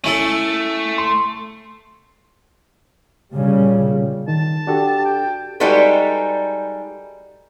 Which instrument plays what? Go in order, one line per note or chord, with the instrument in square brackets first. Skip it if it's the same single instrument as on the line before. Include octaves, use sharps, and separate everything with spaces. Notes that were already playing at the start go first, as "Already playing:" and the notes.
[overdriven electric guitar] A3 [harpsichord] C#4 E4 A4
[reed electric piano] C6
[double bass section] A#2 C#3 G3
[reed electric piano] D#3 [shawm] A5
[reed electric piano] D4 F#4 A4 [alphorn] G4
[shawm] G5
[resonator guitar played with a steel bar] G3 G#3 D#4 F#4 A4 B4